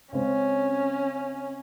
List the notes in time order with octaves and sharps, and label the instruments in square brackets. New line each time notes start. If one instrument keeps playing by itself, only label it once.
[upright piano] C#3 G#3 C4 [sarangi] C#4